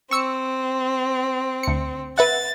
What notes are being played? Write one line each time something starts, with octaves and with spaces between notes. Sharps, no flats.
C4 C#6 E6 C#7
D2 C#7
B4 E5 F#5 A6